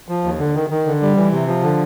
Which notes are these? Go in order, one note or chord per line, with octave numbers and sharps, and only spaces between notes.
F3
D#2
D3
D#3
D#3
D3
G3
E3
C3
F3
D3